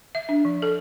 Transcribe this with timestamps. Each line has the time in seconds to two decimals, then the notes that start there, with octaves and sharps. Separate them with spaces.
0.15 E5
0.29 D4
0.45 F3
0.62 A4